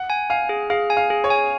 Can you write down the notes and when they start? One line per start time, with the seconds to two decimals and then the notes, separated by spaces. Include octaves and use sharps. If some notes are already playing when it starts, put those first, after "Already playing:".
Already playing: F#5
0.10 G#5
0.30 F5 G#5
0.49 G#4
0.70 G#4 F5
0.90 G#5
0.97 F5
1.10 G#4
1.24 C#5
1.30 G#5